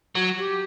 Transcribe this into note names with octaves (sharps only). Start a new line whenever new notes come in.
F#3
G4